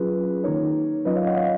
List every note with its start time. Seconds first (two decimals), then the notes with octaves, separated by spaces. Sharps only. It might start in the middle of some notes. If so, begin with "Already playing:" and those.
Already playing: F#3 C#4 F4 G#4 B4
0.44 D#3 A#3 D#4 A#4 C#5
1.05 F#3 C#4 F4 B4 D#5
1.16 C#5 F5
1.26 D#5 F#5
1.36 C#5 F5